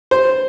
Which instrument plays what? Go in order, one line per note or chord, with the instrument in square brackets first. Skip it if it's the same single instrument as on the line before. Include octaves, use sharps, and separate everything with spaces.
[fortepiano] C5